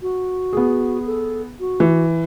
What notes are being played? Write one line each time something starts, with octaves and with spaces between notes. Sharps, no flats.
F#4
B3 G#4
A4
F#4
E3